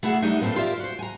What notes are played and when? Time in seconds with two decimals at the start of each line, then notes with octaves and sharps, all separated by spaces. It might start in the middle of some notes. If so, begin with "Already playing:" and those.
0.03 A3 E4 F#4 G#4 F#5
0.22 G3 A3 A#3 D4 D#4 E5
0.41 G2 A#2 C4 D4 A4 B4
0.56 F4 G4 A#4 D5 E5
0.80 F#4 C5
0.99 G#5 A#5